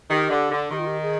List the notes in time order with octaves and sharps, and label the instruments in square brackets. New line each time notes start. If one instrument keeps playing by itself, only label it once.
[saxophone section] D#3 [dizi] G4
[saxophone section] D3
D3
[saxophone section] D#3 [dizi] G4
[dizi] F4
G4
G#4